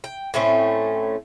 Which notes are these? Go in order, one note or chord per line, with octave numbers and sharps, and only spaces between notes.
G5
A2 A3 C4 C#4